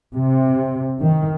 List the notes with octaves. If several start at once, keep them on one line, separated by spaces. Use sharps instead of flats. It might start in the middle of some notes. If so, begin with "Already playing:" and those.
C3
D#3